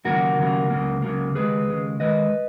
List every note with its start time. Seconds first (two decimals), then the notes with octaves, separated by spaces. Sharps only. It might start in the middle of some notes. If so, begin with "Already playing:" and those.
0.05 D#2 C#3 F#3 A#3 F#4 A#4
0.38 D#2 C#3 F#3 A#3
0.70 C#2 C#3 F#3 A#3
1.02 C#2 C#3 F#3 A#3
1.35 D#2 C#3 G#3 G#4 B4
1.68 D#2 C#3 G#3
2.00 D#2 D#3 G#3 B4 D#5